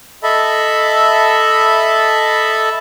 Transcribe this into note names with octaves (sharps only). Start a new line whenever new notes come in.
A4 D#5 E5 A5 B5